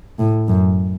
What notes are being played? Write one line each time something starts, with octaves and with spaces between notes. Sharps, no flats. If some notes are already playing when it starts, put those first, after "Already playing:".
A2
F#2